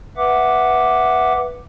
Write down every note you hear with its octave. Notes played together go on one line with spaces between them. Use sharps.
B4 E5 F#5 D6